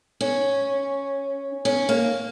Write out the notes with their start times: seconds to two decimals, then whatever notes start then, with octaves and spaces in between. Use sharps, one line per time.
0.21 C#4
1.65 C#4
1.89 A#3